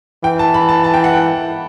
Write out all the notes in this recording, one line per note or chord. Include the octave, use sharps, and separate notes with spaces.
E3 G5
A5
B5
A5
A5
G5
F#5
G5